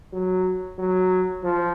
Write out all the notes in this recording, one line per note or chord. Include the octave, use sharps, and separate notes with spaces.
F#3
F#3
F3